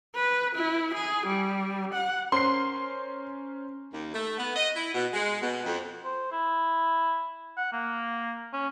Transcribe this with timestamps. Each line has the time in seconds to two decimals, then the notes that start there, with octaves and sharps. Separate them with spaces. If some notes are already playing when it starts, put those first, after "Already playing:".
0.16 B4
0.56 E4
0.94 G#4
1.27 G3
1.94 F#5
2.32 C#4 A#4 C5 C6 C7
3.92 D#2
4.13 A3
4.38 B3
4.56 D#5
4.76 E4
4.93 B2
5.13 G#3
5.42 B2
5.65 F2
6.04 C5
6.32 E4
7.58 F#5
7.73 A#3
8.53 C#4